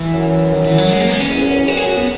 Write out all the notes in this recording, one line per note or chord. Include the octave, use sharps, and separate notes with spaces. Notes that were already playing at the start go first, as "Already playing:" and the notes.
Already playing: E3
F#2
D#3
E3
F#3
G#3
A#3
B3
C#4
E2
F#2
E2
F#2 F#4
G#4
F#4
B3